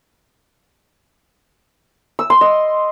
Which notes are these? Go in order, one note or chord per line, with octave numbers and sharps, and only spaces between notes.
E6
C6
D#5